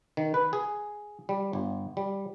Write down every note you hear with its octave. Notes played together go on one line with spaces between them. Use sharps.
D#3
B4
G#4
G3
G1
G3